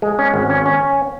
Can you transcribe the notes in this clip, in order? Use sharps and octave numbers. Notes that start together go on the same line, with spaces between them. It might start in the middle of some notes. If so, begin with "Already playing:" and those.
G#3
C#4
G#1
C#4
C#4